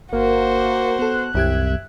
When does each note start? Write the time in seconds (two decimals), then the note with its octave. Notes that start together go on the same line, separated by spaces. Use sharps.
0.12 G1 A#3 F#4 C5
0.99 B3 A4 F#6
1.35 C2 F#2 G4 E5 G#6